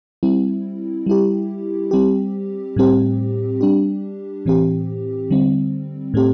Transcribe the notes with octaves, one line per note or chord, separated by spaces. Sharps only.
G3 C4 E4
G3 E4 G4
G3 C4 G4
A2 G3 C4 G4
G3 D4 G4
A2 E3 C4 G4
D3 G3 C4
A2 A3 C4 G4